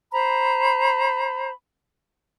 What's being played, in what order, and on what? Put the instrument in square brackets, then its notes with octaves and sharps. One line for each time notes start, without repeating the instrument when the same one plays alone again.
[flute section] C5 A#5 B5